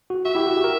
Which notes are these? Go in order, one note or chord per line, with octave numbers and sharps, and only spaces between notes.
F#4
F#4 E5
E4 G4
F#4
G4
A#4